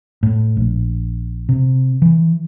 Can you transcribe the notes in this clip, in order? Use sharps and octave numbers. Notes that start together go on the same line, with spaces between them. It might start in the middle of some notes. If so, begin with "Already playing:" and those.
A2
A#1
C3
E3